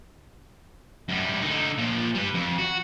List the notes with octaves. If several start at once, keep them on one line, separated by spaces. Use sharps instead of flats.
F#2 G3
D3 D#4
A#2 F3
G3 B4
F2
F#4